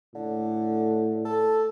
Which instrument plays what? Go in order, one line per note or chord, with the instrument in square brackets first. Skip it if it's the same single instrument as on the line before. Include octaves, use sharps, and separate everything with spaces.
[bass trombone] A2 [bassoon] D3
[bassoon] A4